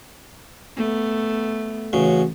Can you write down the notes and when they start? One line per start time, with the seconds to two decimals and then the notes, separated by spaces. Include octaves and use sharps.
0.77 A3 B3
1.93 A1 C#3 F#4